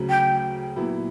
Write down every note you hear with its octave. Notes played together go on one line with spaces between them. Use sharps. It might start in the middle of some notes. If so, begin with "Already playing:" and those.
Already playing: D2 C#3 F#3
G5
A#2 F#3 B3 E4